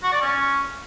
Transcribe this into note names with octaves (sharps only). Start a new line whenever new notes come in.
F#4
D5
C#4